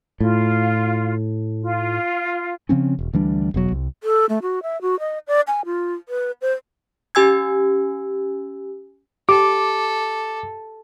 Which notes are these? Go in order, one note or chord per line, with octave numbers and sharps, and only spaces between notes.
A2 F4
F4
C#3 F3 C4 C#4
E1
D2 E3 G3 D4
E1 B2 F#3
C2
A4
A3
F#4
E5
F#4
D#5
D5
G#5
F4
B4
C5
C#4 G4 G#5 E6 G#6
G4 A4 D6